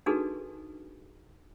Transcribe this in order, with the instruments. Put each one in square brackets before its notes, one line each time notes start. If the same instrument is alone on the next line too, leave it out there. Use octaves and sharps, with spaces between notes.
[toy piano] D4 D#4 F#4 G#4 A4 B4